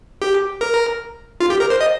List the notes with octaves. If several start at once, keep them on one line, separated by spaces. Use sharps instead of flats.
G4
A#4
F4
G4
A#4
C5
D#5